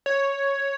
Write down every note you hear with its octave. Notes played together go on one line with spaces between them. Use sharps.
C#5